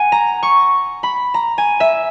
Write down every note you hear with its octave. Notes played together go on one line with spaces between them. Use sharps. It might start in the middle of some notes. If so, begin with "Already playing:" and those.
Already playing: F#5 G#5
A#5
C#6
B5
A#5
G#5
E5